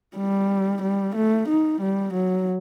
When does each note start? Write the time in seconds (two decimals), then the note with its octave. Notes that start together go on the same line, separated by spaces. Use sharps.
0.17 G3
0.82 G3
1.15 A3
1.48 D#4
1.81 G3
2.14 F#3